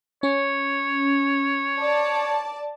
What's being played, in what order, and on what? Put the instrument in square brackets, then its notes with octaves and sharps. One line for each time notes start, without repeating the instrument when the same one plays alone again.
[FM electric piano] C#4 [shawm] C#5
[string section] D5 A5